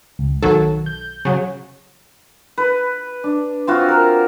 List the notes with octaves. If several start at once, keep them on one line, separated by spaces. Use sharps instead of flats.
C#2
B1 D#3 F#3 A4
G6
C#3 F#3
B4
D4
C4 F4 F#4
A#4